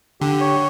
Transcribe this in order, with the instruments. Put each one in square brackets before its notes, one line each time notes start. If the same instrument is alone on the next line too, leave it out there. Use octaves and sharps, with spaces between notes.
[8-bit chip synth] D3 [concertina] G4
[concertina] C#5